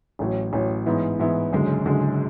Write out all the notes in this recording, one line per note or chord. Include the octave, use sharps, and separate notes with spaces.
A1 A2 F#3
A1 A2 F#3
G#2 E3 B3 E4
G#2 E3 B3 E4
F#1 F#2 D3 G#3
F#1 F#2 D3 G#3